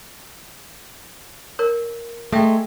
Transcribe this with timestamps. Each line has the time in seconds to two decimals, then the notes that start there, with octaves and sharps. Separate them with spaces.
1.59 A#4 C#5
2.32 G#3 A3 A4 E5 G5